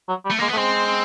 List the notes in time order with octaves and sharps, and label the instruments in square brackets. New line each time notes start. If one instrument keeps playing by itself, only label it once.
[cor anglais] F#3
G3
[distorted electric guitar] A3
[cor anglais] G#3 [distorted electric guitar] A#3
[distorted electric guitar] B3
[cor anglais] A3
[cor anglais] G#3 [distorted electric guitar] C4